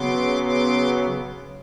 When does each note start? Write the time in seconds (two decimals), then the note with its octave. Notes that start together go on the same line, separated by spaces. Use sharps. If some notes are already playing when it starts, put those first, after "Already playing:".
Already playing: C#3 F#3 B3 C6 D6
0.44 C6 D6